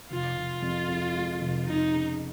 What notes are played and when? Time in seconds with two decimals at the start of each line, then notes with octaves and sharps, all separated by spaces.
0.10 F1 F4
0.36 F1
0.62 F2
0.89 F2
1.15 G#3
1.41 F1
1.66 F1 D#4
1.92 C#3